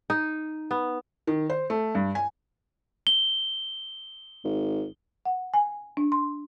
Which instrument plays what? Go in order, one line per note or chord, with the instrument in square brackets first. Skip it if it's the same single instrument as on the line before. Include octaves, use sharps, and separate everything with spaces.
[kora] D#4
B3
[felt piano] D#3
C5
A3
G2
G#5
[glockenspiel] G7
[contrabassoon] G#1
[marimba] F#5
G#5
D4
C6